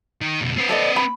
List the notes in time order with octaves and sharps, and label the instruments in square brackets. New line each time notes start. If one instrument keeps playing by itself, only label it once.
[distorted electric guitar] D#3
B1 F2
C4 B4
[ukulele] A4 D5 D#5
B5